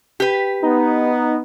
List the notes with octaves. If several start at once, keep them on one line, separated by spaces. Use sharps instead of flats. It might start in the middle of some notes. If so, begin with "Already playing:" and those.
G4 B4
B3 D#4